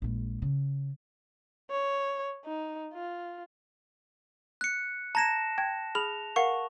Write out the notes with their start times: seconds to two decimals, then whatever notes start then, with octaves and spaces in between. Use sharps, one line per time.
0.02 A#1 G#3
0.42 C#3
1.70 C#5
2.45 D#4
2.93 F4
4.61 F#6 C#7
5.15 A5 A#5 G#6 A#6 E7
5.58 G5 G#6
5.95 G#4 B5 F6 F7
6.36 A#4 F5 F#5 C#6